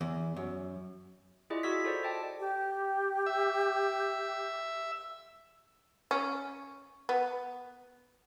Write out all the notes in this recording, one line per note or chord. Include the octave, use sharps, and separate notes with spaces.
E2
F#2
E4 F4 G#4 D5 D#5
F#4 E6 G#6 B6
A4 C5 D5
D5 D#5 G5 A5
G4
E5
C#4
B3